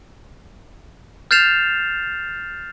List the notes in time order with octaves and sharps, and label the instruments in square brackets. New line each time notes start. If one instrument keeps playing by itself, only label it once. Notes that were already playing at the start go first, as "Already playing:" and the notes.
[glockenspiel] F6 G6 A6 C7 E7 F7